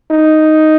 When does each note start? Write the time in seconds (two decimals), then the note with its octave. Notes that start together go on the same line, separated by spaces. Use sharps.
0.11 D#4